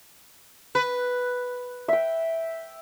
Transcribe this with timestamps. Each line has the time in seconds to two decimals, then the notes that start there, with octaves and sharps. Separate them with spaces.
0.75 B4
1.88 E5 G5